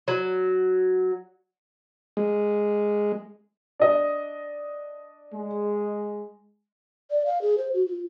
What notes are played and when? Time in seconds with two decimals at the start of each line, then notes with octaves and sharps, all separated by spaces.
0.08 F#3
2.17 G#3
3.80 D4 D#5
5.33 G#3
7.10 D5
7.26 F5
7.42 G#4
7.58 C5
7.74 F#4
7.86 F4